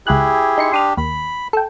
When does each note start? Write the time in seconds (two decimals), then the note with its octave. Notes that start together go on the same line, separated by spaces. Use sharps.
0.07 C#2 E4 G4 G#4 F#6
0.58 D#4 C6 C#7
0.72 D4 G4 C6 D#6 F6
0.97 D#2 B5
1.53 A4 G5